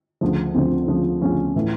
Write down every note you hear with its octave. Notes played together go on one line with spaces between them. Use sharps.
D2 C#3 F3
D2 C#3 F3 C4
D2 C#3 F3
D2 C#3 F3 C#4
A2 E3